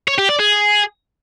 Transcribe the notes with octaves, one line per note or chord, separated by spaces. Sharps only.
C#5
G4
D5
G#4